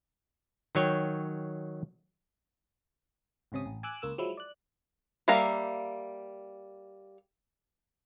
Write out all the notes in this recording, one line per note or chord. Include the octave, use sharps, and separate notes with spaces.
D#3 F#3 C#5 G5
G#1 C#2 C3 C#4 D#6
A1
G#5 D6 E6 F#6
C#2 A#3 E6
F3 F#3 G#3 E4
D5 F#6
G3 A#3 E5 F5 A#5